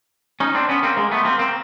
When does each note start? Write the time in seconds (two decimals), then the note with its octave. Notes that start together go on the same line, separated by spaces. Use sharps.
0.40 C#4 D#4
0.55 C4 D4
0.69 B3 C#4
0.83 A#3 C4
0.97 G#3 A#3
1.11 A3 B3
1.25 A#3 C4
1.39 A#3 C4